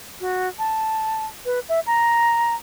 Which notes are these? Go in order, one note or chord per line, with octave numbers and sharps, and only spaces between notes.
F#4
A5
B4
E5
A#5